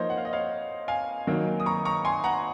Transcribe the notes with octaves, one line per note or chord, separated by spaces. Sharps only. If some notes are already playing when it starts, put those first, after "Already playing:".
Already playing: F3 A#3 D#4 C5 C#5 D#5
F#5
F5
D#5
C#5 F5
F5 G#5
D#3 F#3 A#3 D#4
D#6
A#5 C#6
A#5 C#6
G#5 C6
F#5 A#5